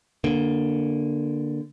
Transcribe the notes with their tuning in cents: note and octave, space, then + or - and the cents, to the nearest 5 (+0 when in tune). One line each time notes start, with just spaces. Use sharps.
D3 +0 A#3 +15